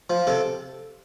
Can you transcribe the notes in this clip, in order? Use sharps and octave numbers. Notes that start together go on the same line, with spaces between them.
F3
C3 A4